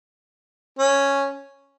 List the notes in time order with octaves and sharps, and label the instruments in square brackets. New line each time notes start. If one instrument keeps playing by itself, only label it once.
[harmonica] C#4